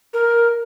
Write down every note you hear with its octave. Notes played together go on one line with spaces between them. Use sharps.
A#4